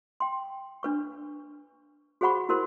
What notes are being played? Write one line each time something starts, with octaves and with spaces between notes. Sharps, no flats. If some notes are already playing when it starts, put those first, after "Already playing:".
G5 C6
D4 B4 C#6
F#4 G#4 C5 F#5 B5 C#6
E4 F#4 A#4 C5 C6